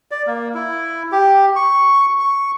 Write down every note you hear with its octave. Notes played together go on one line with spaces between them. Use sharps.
D5
A#3
E4
G4
C#6
C#6